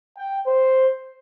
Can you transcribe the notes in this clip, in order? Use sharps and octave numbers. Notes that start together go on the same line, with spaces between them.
G5
C5